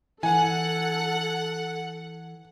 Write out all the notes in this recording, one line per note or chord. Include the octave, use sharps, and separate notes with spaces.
E3 A4 F#5 G#5